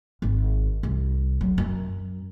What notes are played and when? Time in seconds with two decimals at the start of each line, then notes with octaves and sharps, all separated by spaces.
0.22 G#1
0.83 C2
1.41 F#3
1.58 F#2